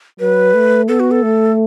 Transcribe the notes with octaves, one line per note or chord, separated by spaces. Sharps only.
F#3 B4
A3
B3 A4
F#4
A4
A3